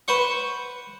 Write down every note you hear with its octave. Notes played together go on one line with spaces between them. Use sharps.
B4 C5 F#5 C#6